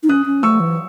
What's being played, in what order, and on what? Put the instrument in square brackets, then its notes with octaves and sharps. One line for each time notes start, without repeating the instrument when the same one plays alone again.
[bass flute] D#4
[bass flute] C#4 [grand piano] D#6 F#6
[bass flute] C#4
[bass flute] A3 [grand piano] C#6 E6
[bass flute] E3